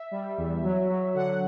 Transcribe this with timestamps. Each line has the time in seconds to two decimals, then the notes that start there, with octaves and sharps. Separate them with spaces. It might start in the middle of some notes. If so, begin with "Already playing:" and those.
Already playing: E5
0.11 G3
0.38 E2
0.63 F#3
0.89 F#3
1.14 D3 F#5